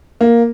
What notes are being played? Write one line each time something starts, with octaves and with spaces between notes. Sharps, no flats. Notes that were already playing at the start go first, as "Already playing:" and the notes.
A#3